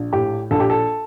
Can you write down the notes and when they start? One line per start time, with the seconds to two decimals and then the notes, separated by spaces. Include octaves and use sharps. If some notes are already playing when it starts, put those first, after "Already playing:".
Already playing: A#1
0.13 A2 G4
0.51 A#1 A4
0.60 G4
0.70 A4